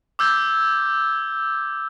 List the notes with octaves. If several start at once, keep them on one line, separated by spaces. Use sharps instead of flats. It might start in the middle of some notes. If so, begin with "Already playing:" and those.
D6 E6 G6 G#6 G7